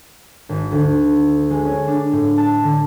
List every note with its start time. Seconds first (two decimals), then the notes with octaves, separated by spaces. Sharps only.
0.49 G#1
0.71 D2
1.50 G#3
1.65 C#4
1.87 D4
2.12 A2
2.38 A5
2.63 D3